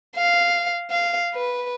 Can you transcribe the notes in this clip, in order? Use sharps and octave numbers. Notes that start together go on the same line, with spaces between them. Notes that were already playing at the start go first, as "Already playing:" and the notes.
F5
F5
B4